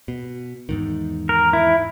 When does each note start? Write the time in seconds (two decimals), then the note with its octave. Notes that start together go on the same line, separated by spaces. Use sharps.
0.08 B2
0.69 E2 G#2 D#3
1.29 A#4
1.53 E4